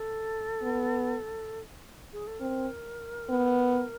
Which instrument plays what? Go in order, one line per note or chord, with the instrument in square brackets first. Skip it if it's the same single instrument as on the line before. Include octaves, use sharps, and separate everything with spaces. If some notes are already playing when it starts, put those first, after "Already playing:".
Already playing: [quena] A4
[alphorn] B3
[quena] G#4
A4
[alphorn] C4 [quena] A#4
[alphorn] B3